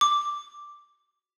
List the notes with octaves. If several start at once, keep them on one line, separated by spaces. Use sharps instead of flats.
D6